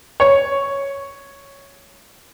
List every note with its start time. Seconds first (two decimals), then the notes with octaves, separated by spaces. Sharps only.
0.20 C#5